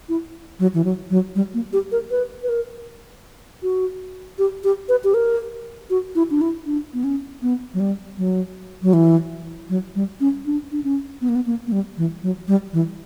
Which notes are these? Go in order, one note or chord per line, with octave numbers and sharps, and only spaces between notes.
E4
F#3
E3
F#3
F#3
G3
A#3
G4
A#4
B4
B4
A#4
F#4
G4
G4
B4
G4
A#4
F#4
E4
D4
E4
D4
B3
C#4
B3
F#3
G3
F#3
F#3
E3
F#3
G3
C#4
D4
D4
C#4
B3
A#3
B3
A#3
A#3
G3
E3
F#3
G3
E3